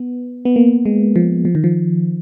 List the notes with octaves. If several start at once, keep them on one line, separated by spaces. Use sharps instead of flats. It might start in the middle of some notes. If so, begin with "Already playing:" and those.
Already playing: B3
B3
A#3
G#3
F3
F3
D#3
F3